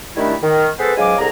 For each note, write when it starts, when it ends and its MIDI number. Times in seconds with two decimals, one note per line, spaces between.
0.16 0.34 51
0.16 0.34 55
0.16 0.34 57
0.16 0.34 62
0.16 0.34 64
0.42 0.67 51
0.78 0.92 59
0.78 0.92 68
0.78 0.92 69
0.78 0.92 71
0.78 0.92 72
0.97 1.14 37
0.97 1.14 44
0.97 1.14 54
0.97 1.14 77
0.97 1.14 80
0.97 1.14 86
1.18 1.29 36
1.18 1.29 50
1.18 1.29 68
1.18 1.29 82